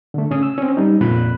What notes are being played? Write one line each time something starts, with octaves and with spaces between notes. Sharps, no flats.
D3 A3
C#3 C#4 D#6
E6
C4 C#4
G3 D#4
F2 A#2 B5 F#6